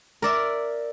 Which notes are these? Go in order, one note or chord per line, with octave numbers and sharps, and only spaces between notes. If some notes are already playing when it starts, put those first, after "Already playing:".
A#4 D5 E5